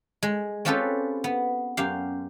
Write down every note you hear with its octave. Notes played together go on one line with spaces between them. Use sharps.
G#3
C4 C#4 F4 G4 A4 B4
B3
F#2 G4 F5